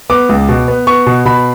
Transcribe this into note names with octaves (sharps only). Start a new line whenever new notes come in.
B3 D6
C#2
B2
B3
B3 C#6
B2
B2 B5